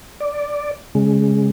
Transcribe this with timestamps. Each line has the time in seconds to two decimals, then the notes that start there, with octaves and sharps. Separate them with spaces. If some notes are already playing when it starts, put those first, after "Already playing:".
0.20 D5
0.95 C#3 G#3